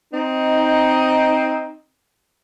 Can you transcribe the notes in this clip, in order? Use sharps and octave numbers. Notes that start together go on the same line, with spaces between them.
C4 D#4